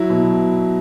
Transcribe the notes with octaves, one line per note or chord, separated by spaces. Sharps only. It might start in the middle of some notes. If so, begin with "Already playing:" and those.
Already playing: F#3 E4
B2